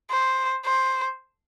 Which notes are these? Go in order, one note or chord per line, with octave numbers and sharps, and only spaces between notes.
C5
C5